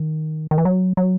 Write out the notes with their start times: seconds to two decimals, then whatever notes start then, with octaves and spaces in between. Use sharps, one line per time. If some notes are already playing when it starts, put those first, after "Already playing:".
Already playing: D#3
0.51 D#3
0.58 E3
0.65 F#3
0.97 F#3